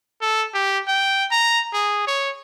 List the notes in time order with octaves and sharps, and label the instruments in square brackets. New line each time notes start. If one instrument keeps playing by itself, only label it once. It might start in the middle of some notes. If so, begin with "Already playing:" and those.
[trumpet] A4
G4
G5
A#5
G#4
C#5